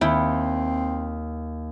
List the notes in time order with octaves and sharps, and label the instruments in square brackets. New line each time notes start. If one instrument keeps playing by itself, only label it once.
[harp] D#2 C#7 [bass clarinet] C4 [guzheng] E4 G5